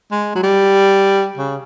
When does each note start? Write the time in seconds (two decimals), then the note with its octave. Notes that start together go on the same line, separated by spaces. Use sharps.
0.11 G#3
0.35 F#3
0.43 G3
1.37 C#3